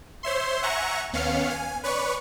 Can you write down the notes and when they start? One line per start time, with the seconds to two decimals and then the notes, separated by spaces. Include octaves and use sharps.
0.23 C5 C#5 E5 C6
0.62 E5 F#5 G#5 A#5 C#6
1.13 D#2 B3 C#4 F5 F6 C#7
1.50 G#5
1.83 B4 C#5 D5 C#6